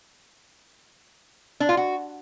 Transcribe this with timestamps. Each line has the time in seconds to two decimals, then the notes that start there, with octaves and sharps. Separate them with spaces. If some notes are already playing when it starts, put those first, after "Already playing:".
1.60 D4
1.69 F4
1.77 F#4